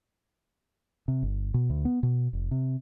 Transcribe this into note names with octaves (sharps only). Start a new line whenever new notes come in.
C3
G1
B2
D2
B3
B2
F1
C3